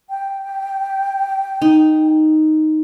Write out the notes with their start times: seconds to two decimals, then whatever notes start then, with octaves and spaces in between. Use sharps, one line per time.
0.10 G5
1.62 D#4